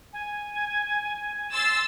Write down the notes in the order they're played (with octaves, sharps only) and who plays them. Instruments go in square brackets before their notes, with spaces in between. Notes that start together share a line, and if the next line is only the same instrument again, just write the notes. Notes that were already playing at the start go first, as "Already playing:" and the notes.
[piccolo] G#5
[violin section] C6 E6 A6